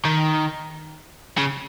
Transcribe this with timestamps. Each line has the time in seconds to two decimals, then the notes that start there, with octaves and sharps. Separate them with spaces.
0.05 D#3
1.38 C#3